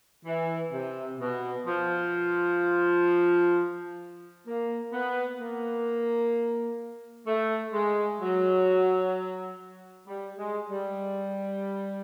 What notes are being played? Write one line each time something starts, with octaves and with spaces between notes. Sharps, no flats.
E3
C3
B2
F3
A#3
B3
A#3
A3
G#3
F#3
G3
G#3
G3